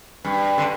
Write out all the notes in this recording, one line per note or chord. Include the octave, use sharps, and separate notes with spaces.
G2
D3